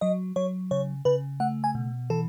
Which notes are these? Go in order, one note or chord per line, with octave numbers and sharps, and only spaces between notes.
F#3 D#5
F#3 C#5
C#3 C#5
C#3 B4
A3 F#5
G#5
B2
E3 A4